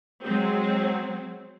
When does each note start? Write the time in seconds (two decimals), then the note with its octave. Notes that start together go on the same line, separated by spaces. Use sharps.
0.25 F#3 G#3 C4